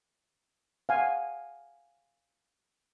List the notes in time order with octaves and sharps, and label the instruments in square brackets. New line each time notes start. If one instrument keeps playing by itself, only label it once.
[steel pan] F5 F#5 G#5